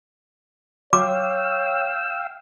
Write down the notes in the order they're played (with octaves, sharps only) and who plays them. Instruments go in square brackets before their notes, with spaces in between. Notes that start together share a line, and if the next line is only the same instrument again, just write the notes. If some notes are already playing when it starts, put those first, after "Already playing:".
[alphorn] C#5 [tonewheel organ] F5 G5 E6 [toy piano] D6